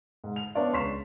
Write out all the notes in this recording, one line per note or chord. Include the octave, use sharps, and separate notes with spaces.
G#2
F7
B3 D4 C#5 D5 F5
C#2 C6 C#6 B6 E7